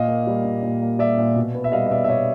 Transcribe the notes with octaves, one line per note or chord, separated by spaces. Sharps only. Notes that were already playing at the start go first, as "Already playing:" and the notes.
Already playing: A#2 D#5 F5
A#3
G3
A#2
A#2
A#3
G3 D5 E5
A#2
B2
B3
E5
G3 D#5 F5
D#5
B2 D5 E5
E5
B2 C#5 D#5